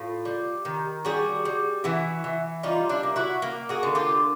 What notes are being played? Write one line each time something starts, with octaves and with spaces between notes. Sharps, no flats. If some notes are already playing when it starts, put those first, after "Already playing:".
Already playing: A2 F4
G3
D#3
G3 F#4 G#4
G3
E3 E4 F#4
E3
G3 D#4 F4
D4 E4
A#3
E4 F#4
A#3
F#4 G#4
D3
F4 G4